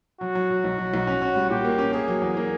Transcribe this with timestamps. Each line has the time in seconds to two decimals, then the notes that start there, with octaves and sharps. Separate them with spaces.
0.21 F#3 F#4
0.35 F#3
0.50 F#3
0.64 B1
0.78 F#3
0.94 B1
1.07 C#4
1.22 C#4
1.36 G3
1.50 A#2 G4
1.65 A#3
1.78 C#4
1.93 A#3 G#4
2.08 F#3
2.21 E2
2.37 A#3